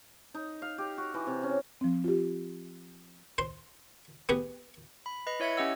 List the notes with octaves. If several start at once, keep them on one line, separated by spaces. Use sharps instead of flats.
D#4
F5
G4
F#4
E3
C3
C#4
F3 C4
F4 G4
C5 C6
B3 G4 G#4
B5
B4 D#5 B5
E4 C#5 E5 G#6 C#7
C#4 G4 D#5 F#5 E6